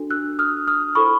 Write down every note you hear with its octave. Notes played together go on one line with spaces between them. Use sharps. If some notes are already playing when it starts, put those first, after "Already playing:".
Already playing: D4 F#4 A4
E6 F#6
D#6 F6
D#6 F6
E4 A4 C5 B5 C#6